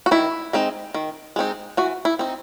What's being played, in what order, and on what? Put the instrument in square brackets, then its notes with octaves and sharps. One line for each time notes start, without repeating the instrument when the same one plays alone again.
[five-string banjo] F#4
D#3 E4
G#3 C4 D#4
D#3
G#3 C4 D#4
E3 F#4
E4
C4 D#4